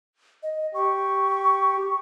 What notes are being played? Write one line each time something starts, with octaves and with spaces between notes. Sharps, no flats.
D#5
G4 C#6